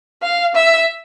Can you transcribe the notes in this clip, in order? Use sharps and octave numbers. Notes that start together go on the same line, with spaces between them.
F5
E5